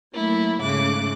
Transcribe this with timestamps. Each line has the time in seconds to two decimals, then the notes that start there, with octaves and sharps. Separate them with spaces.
0.13 F#3 A3 A#3 E4
0.61 G#2 C#3 A3 D6 F#6